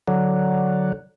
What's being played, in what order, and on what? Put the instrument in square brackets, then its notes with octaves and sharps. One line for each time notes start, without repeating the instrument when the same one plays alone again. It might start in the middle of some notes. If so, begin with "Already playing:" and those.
[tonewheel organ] D3 F#3